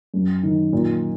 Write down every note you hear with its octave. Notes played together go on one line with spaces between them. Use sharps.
F#2
D#3
A#2